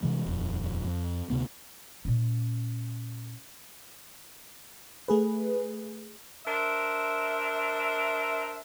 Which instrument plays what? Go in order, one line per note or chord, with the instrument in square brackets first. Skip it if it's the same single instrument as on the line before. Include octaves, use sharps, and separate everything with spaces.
[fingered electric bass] C3 E3 G#3
D#1 F2
F2
D2 C3 G#3 B3
[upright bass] A#2 C#4
[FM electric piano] A3 G#4 B4
[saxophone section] D4 A#4 C5 E5